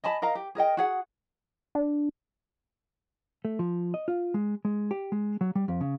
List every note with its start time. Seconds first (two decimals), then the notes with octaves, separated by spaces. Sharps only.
0.04 D#5 G#5 A5 B5
0.22 A#4 D#5 F5 A#5
0.35 G4
0.55 G#4 A#4 D#5 G5
0.77 F#4 G#4 F#5
1.75 D4
3.45 A3
3.59 F3
3.94 D#5
4.08 F4
4.34 G#3
4.65 G#3
4.91 G4
5.12 G#3
5.41 F#3
5.55 G3
5.68 F2
5.81 C#3